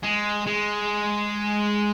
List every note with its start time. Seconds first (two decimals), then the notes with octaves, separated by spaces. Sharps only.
0.04 G#3
0.46 G#3